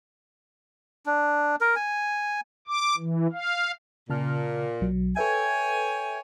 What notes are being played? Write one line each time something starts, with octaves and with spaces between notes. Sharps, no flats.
D4
A#4
G#5
D6
E3
F5
A#2 C#3 A5 F6
B1 F#3
A4 B4 C#5 E5 G5 G#5